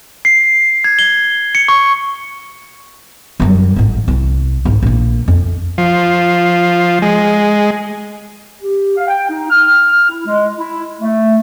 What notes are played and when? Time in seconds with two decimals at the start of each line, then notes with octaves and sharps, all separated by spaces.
0.25 C7
0.84 G#6
0.99 G7
1.55 C#7
1.68 C#6
3.40 F#2 G3
3.76 A1 G#2
4.08 C2
4.65 G#1
4.83 A#1 A#3
5.28 F2
5.78 F3
7.02 G#3
8.62 G4
8.97 F5
9.08 G5
9.29 D#4
9.51 F6
10.09 E4
10.27 G#3
10.58 E4
11.01 A3